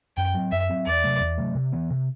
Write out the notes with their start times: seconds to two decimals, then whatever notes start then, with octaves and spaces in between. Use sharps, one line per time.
0.17 F#2 G5
0.34 F#3 C4
0.52 F#2 E5
0.70 F#3 C4
0.86 E2 D5
1.04 C3 F#3 A3
1.20 E2
1.38 C3 F#3 A3
1.55 C3
1.73 E3 B3
1.90 C3